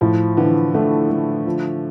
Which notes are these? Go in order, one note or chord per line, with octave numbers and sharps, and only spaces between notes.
A2 F3
D3 E3
D3 A3
A3
F3